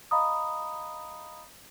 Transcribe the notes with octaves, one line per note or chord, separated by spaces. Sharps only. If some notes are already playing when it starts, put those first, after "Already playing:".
D#5 F5 A#5 B5 D#6